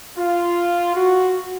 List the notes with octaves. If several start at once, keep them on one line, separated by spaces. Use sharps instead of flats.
F4
F#4